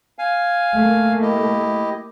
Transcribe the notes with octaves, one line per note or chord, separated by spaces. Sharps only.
F5 G#5
A3 A#3
E4 G4 D#5